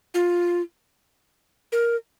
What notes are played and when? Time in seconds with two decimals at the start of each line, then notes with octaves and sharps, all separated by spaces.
0.14 F4
1.72 A#4